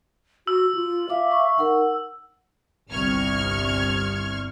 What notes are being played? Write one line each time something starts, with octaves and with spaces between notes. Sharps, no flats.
F#4 E6
F4
E5 F5 D6
C#6
D#4 A#4 F#5
G1 C2 C#6 F6 G#6